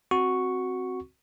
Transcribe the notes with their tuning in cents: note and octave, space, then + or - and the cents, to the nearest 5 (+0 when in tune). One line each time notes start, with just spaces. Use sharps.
C4 +0 F#4 +0 C#6 +0